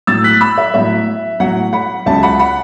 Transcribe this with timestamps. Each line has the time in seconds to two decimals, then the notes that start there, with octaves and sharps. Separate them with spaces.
0.07 A2 F#3 E6 A6
0.24 F#6 B6
0.41 B5 E6
0.58 E5
0.74 A2 F#3 E5
1.40 A2 F#3 F#5
1.73 F#5 B5
2.06 C#2 C#3 F#3 E5 A5
2.23 F#5 B5
2.39 F#5 B5